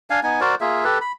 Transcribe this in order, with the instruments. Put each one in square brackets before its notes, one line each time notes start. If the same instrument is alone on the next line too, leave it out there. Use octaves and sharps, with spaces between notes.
[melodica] D4 F5 G#5
B3 D#4 G#5
F#4 A#4 C5 D5
A#3 F4 G#4 E5
G4 A4 B4
B5